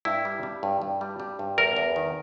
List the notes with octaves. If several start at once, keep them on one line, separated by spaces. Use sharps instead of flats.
G2 E4
G3
G3
G2
G2
G3
G3
G2
E2 A#4
E2
D#3